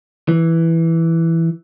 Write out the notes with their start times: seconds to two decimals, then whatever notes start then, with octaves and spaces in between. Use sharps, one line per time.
0.29 E3